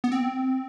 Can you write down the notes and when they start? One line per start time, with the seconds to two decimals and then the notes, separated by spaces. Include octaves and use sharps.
0.04 B3
0.12 C4